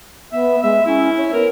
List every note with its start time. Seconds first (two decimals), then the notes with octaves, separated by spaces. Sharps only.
0.33 B3 E5
0.63 G#3 E5
0.86 C#4 E4
1.18 C#5
1.33 B3 A#4